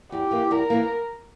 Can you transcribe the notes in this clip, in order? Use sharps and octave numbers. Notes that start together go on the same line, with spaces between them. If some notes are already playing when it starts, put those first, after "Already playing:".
E2 G4
E3 A#3
E2 A#4
E3 A#3